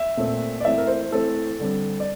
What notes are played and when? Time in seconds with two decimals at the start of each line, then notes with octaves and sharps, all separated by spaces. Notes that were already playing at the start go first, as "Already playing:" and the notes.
Already playing: E5
0.17 A#2 A3 C4
0.61 D5
0.64 E3 A3 C4 E5
0.78 A#4
0.87 C5
1.11 E3 A3 C4 A4
1.60 D3 G3 C4
2.00 D5